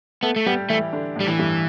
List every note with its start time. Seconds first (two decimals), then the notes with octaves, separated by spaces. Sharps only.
0.23 A3 B3 A4
0.36 A3
0.46 G3 B3 G4
0.70 E3 A3 E4
0.93 D3 D4
1.16 A2 A3
1.20 G3
1.27 E3
1.39 G2 G3